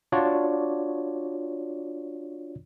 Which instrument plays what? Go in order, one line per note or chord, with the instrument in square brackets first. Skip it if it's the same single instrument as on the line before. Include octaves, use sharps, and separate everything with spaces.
[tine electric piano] D4 F4 F#4 C#5 D5